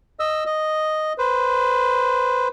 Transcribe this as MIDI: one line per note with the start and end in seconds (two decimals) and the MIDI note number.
0.20 0.44 75
0.20 0.44 88
0.46 1.13 75
1.18 2.48 71
1.18 2.48 72